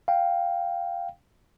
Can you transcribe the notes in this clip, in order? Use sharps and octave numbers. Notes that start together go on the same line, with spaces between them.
F5 G5